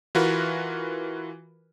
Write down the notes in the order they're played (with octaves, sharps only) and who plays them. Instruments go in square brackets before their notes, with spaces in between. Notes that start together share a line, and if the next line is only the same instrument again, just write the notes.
[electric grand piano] E3 F4 F#4 A#4 B4